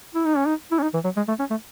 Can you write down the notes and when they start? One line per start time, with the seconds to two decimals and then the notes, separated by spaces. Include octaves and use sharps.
0.14 E4
0.25 D#4
0.36 C#4
0.47 D#4
0.71 E4
0.78 C#4
0.83 D#4
0.94 E3
1.04 F#3
1.17 G#3
1.28 A3
1.39 C#4
1.50 A3